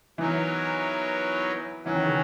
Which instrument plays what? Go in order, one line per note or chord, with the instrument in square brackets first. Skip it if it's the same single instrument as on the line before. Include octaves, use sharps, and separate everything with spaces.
[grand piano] E3 [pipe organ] F#3 B3 D#4 A#4 C#5
[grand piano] E3 [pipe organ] F#3 C#4 F#4
[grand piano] D#3
C#3